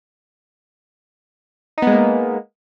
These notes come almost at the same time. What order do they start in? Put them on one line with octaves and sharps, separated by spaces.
D#4 B3 G#3 A#3